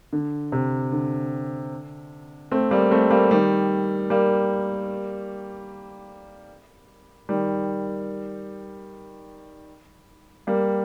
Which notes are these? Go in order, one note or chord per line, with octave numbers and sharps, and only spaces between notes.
D3
C3
D3
A3 C4
G3 A#3
A3 C4
G3 A#3
D#3 G3
G3 A#3
D#3 G3
G3 A#3